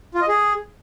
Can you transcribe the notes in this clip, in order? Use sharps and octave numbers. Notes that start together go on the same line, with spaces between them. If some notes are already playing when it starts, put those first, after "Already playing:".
F4
D#5
G#4